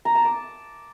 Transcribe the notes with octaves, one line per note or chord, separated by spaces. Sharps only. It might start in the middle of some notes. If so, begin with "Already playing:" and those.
A#5
A5
D6